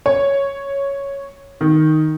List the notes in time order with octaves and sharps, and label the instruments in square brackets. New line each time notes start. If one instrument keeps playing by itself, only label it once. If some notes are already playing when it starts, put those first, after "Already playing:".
[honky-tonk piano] C#5
D#3